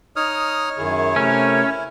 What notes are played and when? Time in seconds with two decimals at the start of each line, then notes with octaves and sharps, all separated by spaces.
0.16 D#4 C#5 D#6 F6
0.78 F#2 D#3 E4 G#4
1.16 C3 A3 C#4 A#4